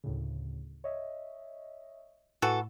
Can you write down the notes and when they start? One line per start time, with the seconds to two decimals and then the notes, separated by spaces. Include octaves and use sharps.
0.04 D2 A2 C#3
0.84 C#5 D#5 E5
2.42 A2 E3 F#4 A4